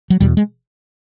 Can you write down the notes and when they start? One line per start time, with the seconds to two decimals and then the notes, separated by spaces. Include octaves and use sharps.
0.10 F#3
0.20 E2 B2 G3
0.37 G#3